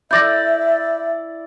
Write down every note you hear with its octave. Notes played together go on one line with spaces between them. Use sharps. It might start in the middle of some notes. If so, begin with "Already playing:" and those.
E4 D5 E5 G6 A#6